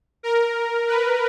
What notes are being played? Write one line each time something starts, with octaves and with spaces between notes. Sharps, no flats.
A#4
B4